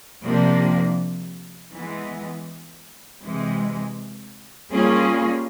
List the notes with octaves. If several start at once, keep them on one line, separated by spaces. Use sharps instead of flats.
C3 F3 A#3 D4
E3 G#3 B3
C3 E3 G#3
G3 A#3 C#4 F4 G#4